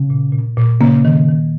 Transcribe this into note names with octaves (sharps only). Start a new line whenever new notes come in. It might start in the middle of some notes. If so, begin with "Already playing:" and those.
Already playing: C#3
A#2
A#2
A#2
C#3 A#3
D#3
D#3